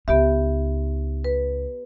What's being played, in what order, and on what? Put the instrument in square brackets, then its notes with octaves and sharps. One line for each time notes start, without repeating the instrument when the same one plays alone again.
[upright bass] C#2 D#4 [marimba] B3 G4 E5
[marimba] B4